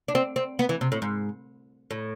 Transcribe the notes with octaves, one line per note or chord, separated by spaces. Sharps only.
D4
C4
C4
B3
E3
C3
A2
G#2
A2